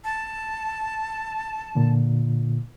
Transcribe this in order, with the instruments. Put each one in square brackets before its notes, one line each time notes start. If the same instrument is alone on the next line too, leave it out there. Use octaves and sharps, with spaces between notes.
[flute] A5
[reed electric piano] A#2 D3